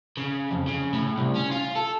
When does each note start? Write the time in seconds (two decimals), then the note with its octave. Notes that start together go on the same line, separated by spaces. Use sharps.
0.17 C#3
0.51 F2
0.68 C#3
0.94 A2
1.18 C2
1.35 C#4
1.51 F4
1.75 A4